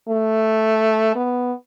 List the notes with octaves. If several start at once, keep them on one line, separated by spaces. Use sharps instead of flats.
A3
B3